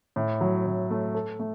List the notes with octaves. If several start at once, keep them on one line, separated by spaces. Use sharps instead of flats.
A2
F#3
A2
A3
A4
A3